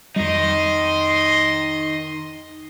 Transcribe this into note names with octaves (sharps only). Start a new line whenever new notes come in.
F2 D#3 G3 D#4 D#5 C6